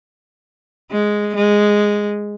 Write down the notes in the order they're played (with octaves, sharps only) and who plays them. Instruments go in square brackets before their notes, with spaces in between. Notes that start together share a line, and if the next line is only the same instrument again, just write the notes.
[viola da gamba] G#3
G#3